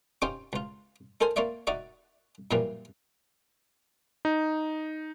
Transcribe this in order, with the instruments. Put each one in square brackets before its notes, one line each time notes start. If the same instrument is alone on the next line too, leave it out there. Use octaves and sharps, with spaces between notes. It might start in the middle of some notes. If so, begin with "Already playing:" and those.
[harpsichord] C#4 D#4 F4 G4 C5 G5
C#2 F4
D#4 A4 A#4 C5 G#5
A#3 F4 C#5 D5 E5
D#4 F#4 D5 E5
F#2 A#2 E3 F3 G3 A#3
[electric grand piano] D#4